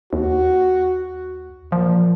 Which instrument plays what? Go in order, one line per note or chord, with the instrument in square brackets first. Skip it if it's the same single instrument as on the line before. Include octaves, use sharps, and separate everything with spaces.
[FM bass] D#2 [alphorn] F#4
[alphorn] A#2 [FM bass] F3